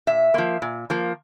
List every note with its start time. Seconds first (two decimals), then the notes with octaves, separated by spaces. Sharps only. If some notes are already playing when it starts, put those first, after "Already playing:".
0.07 A#2 E5
0.34 F3 A#3
0.62 A#2
0.90 F3 A#3